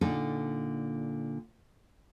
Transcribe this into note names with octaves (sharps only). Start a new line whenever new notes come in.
A#2 D3 D#4 A4